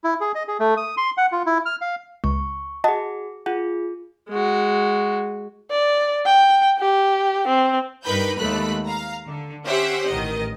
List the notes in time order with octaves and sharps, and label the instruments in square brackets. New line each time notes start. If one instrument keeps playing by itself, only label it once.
[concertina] E4
G#4
D#5
G#4
A3
D#6
C6
F#5
F4
E4
F6
F5
[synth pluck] C#2 [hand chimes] C#6
[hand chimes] F#4 G#4 [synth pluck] D#5 F#5 A5
[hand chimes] F4 G#4 [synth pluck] F#5
[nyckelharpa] G#3 F#4
[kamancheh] D5
G5
G4
C4
[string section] G2 D#4 A#4 B4 B5 G6
D#2 G#3 A3 B5 F#6
F5 A#5
D3
C#4 G4 C5 E5 F#5
A1 D#3 D#5